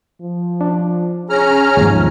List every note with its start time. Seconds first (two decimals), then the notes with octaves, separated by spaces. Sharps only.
0.21 F3
0.61 D4
1.30 C#4 G#4 A#5 F6
1.77 D#2 G#2 F3